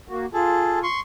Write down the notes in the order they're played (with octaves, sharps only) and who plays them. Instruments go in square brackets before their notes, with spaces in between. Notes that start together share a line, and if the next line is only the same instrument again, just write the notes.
[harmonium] A#3 F#4
[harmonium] F4 [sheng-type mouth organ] G#4 A4
[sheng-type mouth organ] C6 C#6